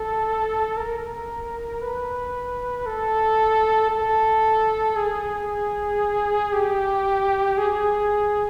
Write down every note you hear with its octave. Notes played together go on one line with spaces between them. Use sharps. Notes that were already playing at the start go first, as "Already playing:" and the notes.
Already playing: A4
A#4
B4
A4
A4
G#4
G4
G#4